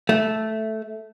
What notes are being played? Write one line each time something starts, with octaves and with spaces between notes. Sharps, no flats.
A3